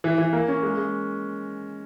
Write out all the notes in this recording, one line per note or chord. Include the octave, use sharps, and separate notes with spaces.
E3
E3
A#3
C#4
G#3
G#3